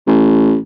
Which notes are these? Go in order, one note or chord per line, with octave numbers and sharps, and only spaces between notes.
A1